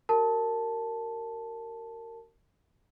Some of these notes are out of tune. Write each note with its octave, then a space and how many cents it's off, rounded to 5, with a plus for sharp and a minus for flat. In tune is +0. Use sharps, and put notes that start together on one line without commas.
F#4 +35 A#4 -20 A5 +0